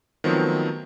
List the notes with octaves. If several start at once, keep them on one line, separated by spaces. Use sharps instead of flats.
D#3 F3 F#3 A3 B3 C4